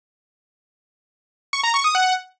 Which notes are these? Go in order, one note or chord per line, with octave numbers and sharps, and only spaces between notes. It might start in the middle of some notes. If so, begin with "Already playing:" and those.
C#6
A#5
C#6
D#6
F#5